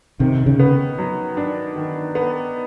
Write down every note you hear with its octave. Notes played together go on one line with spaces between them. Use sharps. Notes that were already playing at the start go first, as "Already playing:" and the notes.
C3 D#3
C#3
B3
F#3
D4
D#3
B3